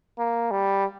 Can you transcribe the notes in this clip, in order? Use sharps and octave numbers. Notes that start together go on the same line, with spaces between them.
A#3
G3